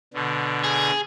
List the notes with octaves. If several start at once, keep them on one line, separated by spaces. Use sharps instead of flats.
B2 D3
G#4